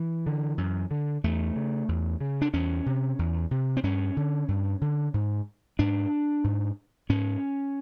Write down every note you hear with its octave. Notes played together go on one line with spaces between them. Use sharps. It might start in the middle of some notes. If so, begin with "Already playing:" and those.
Already playing: E3
D3
F#2
D3
E2 A3
C#3
E2
C#3
D4
E2 C#4
C3
E2
C3
C4
G2 C#4
D3
G2
D3
G#2
G#2 D4
G#2
G#2 C#4